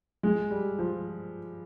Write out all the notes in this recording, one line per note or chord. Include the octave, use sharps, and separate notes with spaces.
G#3
G3
F3